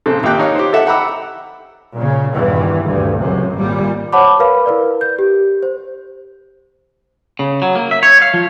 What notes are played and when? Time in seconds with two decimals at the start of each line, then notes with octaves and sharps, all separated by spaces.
0.06 A#1 C#3 C4 A4
0.23 G#1 A#3 G4 G5 F#6
0.39 D#4 C#5 F5
0.55 G4 C5
0.73 A4 E5 F#5
0.87 F#5 G5 A#5 B5 D6 E6
1.95 A#2 C#3
2.34 E2 G2 A#2 D#3 E3
2.83 D2 G2
3.19 C#2 F#2 C3
3.55 G#1 A#2 G3
4.13 C5 C#5 F#5 A5 B5 D6
4.39 A#4 B4 F5 B5
4.66 E4 A#4 B4 D5
5.01 G6
5.19 G4
5.63 C5
7.39 C#3
7.62 F#3
7.75 A#3
7.91 E5
8.03 C#5
8.22 F5
8.34 F3